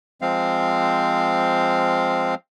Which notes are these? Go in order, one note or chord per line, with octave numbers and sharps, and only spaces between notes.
F3 G#3 C4 F5